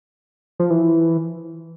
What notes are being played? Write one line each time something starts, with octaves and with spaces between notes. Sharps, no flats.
F3
E3